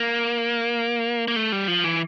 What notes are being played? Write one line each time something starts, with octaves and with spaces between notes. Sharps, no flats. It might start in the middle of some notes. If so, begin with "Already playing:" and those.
Already playing: A#3
A#3
A3
G3
F3
E3